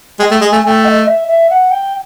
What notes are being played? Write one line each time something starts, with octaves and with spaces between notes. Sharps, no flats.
G#3 G5
A3
G#3
A3 G#5
A3 G5 G#5
D#5
E5
E5
F#5
G5